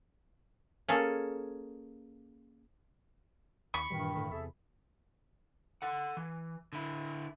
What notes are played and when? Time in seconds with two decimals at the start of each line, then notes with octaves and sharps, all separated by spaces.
0.88 A#3 C#4 G#4 A4
3.74 D#2 B5 C#6
3.90 G2 A#2 D#3 E3 G3
4.16 A2 D3
4.31 E2 C3 G#4 A4 E5
5.82 A4 F#5
6.17 E3
6.73 D3 E4